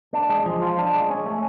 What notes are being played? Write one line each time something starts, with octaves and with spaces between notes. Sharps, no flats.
D4
G#3
F3
F4
D4
G#3
C#4
A3